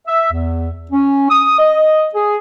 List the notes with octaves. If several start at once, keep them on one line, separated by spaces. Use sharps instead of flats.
E5
E2
C#4
D#6
D#5
G#4